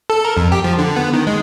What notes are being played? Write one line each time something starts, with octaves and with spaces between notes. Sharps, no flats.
A4
A#4
F2
G4
F3
D3
B3
D#3
G#3